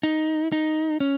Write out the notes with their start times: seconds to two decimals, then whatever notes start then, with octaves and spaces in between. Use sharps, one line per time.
0.03 D#4
0.52 D#4
1.00 C#4